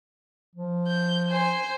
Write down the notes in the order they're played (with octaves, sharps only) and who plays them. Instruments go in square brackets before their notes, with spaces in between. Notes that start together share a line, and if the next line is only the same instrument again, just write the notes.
[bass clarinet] F3
[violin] G6
C5 G#5